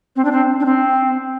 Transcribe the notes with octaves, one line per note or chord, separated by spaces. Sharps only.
C4
D4
C4
D4
C4